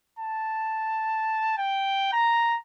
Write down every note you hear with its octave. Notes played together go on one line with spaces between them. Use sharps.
A5
G5
A#5